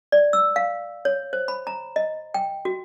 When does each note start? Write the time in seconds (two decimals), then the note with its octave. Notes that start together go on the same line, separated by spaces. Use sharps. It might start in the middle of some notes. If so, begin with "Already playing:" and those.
0.12 D5
0.33 E6
0.56 F5
1.05 C#5
1.33 C5
1.48 B5
1.67 A#5
1.96 D#5
2.34 G5
2.65 F#4